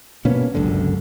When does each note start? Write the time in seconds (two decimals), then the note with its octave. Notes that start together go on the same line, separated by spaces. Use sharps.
0.25 B2 A#3 B3 C#4
0.55 G1 C#2 F#2 D3